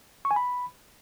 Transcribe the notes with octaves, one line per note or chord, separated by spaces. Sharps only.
C#6
G#5
B5